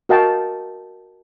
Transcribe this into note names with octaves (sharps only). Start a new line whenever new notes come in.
F#4 A#4 D#5 F5 G5 A5